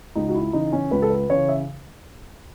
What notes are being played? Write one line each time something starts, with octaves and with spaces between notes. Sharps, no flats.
C#2 D#4
F#4
E4
C#3 E3 D#4
C#4
C#2 B4
A4
B4
C#3 E3 C#5
E5